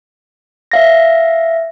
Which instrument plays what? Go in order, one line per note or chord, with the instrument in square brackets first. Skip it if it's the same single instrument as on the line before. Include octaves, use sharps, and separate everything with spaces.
[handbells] E5 F5 A#6